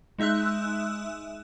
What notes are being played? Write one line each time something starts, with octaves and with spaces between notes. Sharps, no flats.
G#3 D#4 E5 E6 F#6